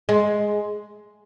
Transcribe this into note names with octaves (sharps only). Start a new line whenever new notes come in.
G#3